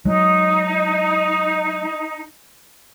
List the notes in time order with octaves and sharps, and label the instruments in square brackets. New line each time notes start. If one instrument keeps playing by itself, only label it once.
[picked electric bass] F#3 G#3 [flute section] D#4